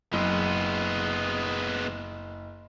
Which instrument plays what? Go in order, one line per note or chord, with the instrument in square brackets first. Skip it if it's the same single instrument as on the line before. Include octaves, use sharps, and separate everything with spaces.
[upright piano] F#1 [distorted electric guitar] G#3 B3